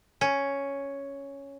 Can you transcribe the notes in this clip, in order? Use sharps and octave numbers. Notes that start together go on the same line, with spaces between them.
C#4